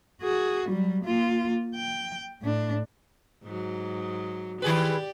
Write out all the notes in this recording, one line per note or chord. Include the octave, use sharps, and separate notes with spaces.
F#4 G#4
F#3 G3
A#3 F4
G5
A2 D4
G#2 F#3
D#3 G4 G#4 B4 D5